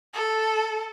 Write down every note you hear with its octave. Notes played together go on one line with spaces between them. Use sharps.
A4